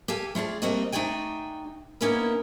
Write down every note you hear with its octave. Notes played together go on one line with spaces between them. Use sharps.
G4 A4 F5 G#5
A3 F4 G#4 D5
G3 A3 A#3 C4 F#4 D#5
A3 D#4 F#4 D5 G5 G#5
A#3 B3 C#4 D#4 E4 A#4